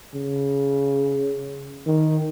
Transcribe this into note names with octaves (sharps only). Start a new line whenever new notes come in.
C#3
D#3